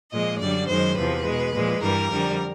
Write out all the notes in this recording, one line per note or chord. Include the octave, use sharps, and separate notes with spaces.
A#2 F3 G#3 D#5
F#2 D3 G3 D5
F#2 D#3 G#3 C5
E2 C3 F3 B4
B2 G#3
A#2 F3 G#3
G2 E3 G3 A#4
F2 D3 G3